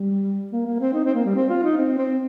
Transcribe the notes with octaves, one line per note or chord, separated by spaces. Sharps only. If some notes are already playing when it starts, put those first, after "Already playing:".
Already playing: G3
A#3
A#3
C4
D#4
C4
A#3
G3
C4
F4
D#4
C4
C4